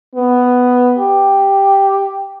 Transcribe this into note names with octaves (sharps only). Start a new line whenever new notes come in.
B3
G4